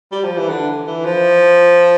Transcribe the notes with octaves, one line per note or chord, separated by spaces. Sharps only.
G3
F3
E3
D3
E3
F3